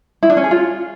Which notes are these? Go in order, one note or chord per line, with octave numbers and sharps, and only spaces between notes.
E4
D4
C#4
G#4
F4